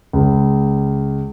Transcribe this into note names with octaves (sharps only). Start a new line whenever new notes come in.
C#2